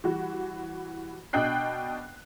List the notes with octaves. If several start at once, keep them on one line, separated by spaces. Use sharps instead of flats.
E3 G3 F#4
B2 D4 D#5 G5 F#6 C7